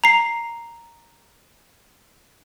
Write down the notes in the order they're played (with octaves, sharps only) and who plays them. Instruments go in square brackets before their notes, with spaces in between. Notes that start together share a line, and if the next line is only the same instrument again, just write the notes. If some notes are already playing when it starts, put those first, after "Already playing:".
[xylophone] A#5 C7